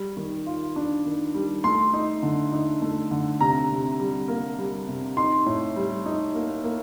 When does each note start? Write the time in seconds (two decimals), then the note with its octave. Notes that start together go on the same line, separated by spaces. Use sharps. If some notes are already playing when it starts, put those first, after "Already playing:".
Already playing: G3
0.17 D#3
0.46 F4
0.76 D4
1.05 D#3
1.34 G3
1.64 A3 C6
1.93 D#4
2.23 D3
2.52 D#4
2.82 A3
3.11 D3
3.40 C3 A#5
3.70 C3
4.00 G3
4.28 A#3
4.58 G3
4.88 C3
5.17 D#4 C6
5.46 A2
5.76 G3
6.06 D#4
6.35 A#3
6.64 A#3